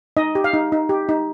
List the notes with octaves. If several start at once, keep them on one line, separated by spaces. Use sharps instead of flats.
D#4 D#5
G4
F5
D#4
D#4
G4
D#4